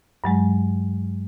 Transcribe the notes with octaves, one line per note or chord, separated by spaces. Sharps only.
G2 F#3 G#3